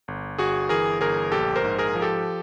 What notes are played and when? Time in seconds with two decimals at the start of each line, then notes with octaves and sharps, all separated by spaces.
0.08 G1
0.38 G1 F#4 G#4
0.69 E3 G#4 A#4
1.01 G1 G#4 A#4
1.32 A#1 G4 A4
1.56 A#4 C5
1.64 G#2
1.79 G#4 A#4
1.95 F3
2.02 G4 A4